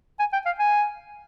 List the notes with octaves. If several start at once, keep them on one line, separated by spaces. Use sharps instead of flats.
G#5
G5
F5
G#5